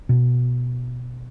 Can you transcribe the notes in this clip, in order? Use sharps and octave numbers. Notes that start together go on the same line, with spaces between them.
B2